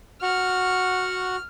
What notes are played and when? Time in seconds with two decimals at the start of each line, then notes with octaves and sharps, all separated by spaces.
0.22 F#4 F#5 C#6 F6